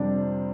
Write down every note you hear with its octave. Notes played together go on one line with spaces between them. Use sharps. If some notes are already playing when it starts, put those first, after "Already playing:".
Already playing: F2 C3 G3 D4